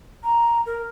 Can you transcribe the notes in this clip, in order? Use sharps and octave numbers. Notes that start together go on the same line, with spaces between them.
A#5
A#4